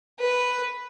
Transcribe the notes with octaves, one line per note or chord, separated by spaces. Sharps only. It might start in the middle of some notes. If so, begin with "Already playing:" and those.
B4